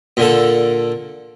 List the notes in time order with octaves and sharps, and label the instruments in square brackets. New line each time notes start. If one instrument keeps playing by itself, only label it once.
[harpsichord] A#2 D3 A4